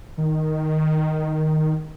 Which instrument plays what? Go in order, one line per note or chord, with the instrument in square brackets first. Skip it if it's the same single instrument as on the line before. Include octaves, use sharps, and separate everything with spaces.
[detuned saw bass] D#3